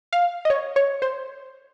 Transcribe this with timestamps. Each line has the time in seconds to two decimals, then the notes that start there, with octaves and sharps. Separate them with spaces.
0.13 F5
0.45 D#5
0.50 C#5
0.76 C#5
1.02 C5